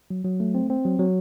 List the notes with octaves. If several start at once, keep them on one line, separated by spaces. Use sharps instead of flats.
F#3
F#3
A3
C4
C4
F#3
F#3